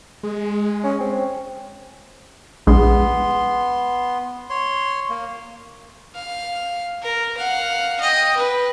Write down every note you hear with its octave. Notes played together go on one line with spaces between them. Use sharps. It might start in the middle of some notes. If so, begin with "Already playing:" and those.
G#3
C#4
C4
A#1 G#3 B3 C6
C#5 C6
A#3
F5
A#4
F5 F#5
D#5 G5
B4